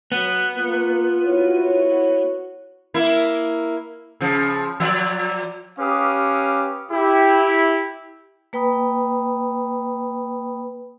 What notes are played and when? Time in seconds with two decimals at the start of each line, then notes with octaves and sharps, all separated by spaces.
0.12 F#3 B3
0.57 A#3 F4
1.26 E4 F#4 C#5
2.94 A#3 E4
4.20 C#3 F3
4.80 F3 D5
5.79 C#4 G4 B4 F5 D6 D#6
6.91 E4 G4
8.53 A#3 B4 G5 B5 D#6